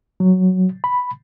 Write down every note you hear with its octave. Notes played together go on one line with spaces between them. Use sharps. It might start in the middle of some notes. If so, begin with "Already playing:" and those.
F#3
B5